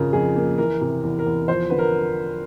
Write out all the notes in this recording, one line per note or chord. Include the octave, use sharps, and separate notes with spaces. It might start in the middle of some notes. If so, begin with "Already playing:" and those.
Already playing: F2 C#3 F3 A#4
F2 G#4
A#3
E3 A#4
C3
E2
A#4
E2
F3 C5
D3 B4
A#4